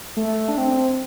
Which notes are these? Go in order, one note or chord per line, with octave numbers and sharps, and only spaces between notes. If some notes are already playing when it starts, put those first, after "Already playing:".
A3
D4
C4